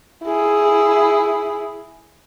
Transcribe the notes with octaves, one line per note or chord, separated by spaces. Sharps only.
E4 G#4